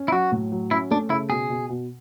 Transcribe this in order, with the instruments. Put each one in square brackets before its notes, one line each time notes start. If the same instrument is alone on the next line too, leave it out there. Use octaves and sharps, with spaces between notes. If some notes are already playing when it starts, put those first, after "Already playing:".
Already playing: [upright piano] C#4
[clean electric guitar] E4
[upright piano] F#3 [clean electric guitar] F#4
[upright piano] A2
F#3
[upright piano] C#4 [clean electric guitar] E4
[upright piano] A3 [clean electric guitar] D4
[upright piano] C#3 [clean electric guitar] E4
[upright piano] B2 [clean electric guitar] G#4
[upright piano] B2
B2